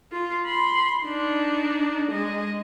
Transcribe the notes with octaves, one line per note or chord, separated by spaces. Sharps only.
F4
B5 C6
D4 D#4
G#3 D#5